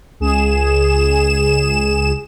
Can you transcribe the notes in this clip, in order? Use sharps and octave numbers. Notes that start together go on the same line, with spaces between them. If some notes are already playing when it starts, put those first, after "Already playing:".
C#2 G#4 E7